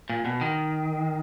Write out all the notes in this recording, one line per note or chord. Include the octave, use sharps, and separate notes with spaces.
A#2
B2
D#3